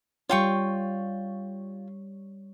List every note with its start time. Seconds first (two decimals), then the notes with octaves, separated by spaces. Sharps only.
0.30 G3 F4 C#5 G5 C#6